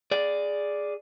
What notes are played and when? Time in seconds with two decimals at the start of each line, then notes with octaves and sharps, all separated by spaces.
0.11 G#4 D5